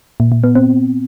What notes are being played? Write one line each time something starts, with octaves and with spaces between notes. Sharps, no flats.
A#2
A#2
B3
C4